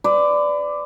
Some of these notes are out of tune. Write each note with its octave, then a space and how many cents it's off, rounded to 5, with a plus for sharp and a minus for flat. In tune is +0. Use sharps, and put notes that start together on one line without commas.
B4 +35 D5 +0